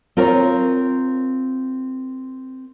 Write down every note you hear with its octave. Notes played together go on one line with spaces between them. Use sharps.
C4 F4 A#4 C#5